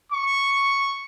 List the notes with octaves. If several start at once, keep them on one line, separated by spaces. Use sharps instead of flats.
C#6